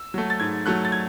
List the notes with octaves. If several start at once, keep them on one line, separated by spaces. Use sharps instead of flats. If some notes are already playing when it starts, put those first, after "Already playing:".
Already playing: E6
F#3 A3
A6
G#2 G#6
F#3 A3 F#6
A6
G#6